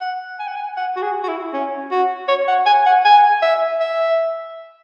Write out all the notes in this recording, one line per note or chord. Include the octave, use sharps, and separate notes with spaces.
F#5
G#5
F#5
G#5
F#5
F#4
G#4
F#4
E4
C#4
F#4
C#5
F#5
G#5
F#5
G#5
E5
E5